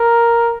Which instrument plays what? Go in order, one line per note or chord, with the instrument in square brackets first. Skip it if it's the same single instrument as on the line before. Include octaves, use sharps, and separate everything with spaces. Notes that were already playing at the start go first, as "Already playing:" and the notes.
Already playing: [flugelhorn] A#4